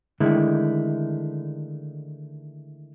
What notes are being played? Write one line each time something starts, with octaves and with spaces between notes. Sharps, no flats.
D3 D#3 G#3 A3 E4